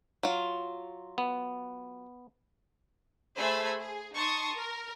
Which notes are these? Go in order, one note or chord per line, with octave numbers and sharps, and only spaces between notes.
F#3 F4
B3
A3 G#4 C5 G#5 B5 E6
G#4
D#4 A5 C6 C#6 D#6
A#4